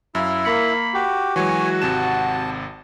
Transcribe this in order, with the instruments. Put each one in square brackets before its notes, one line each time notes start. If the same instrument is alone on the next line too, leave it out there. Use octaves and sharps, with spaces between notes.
[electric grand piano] F#2 F5 [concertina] E4
[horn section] A#3 B5 [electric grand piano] C#7
[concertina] F#4 G4
[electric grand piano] E3 F#3 G#3 [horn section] F#4 [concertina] C#5 G#5
[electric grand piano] G#1 C3 E7 [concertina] A5